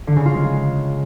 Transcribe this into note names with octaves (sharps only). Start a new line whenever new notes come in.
D3
C#3
F4
G#3